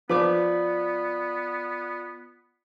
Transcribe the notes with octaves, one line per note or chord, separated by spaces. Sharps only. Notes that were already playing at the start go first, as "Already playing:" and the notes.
F3 B3 F4 B4 D5 D6